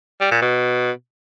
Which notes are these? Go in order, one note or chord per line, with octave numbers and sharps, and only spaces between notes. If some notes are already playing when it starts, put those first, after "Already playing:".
G3
A#2
B2